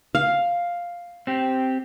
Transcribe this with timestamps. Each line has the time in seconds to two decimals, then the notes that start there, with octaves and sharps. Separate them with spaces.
0.15 F5
1.27 C4 G4